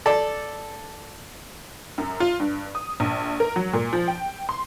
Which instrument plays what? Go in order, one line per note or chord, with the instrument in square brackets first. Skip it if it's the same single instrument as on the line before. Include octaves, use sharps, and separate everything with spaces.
[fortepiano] A4 D5
[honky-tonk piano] F#2
F4
G2
D#6
A#1
A#4
F#3
A#2
F3
G5
C6